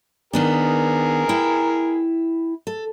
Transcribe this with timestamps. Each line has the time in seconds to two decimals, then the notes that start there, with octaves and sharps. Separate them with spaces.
0.33 D#3 B3 D4 G#4 A#4
1.29 E4 G5
2.67 A4